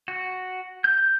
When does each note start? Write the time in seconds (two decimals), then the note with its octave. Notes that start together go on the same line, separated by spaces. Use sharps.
0.08 F#4
0.84 G6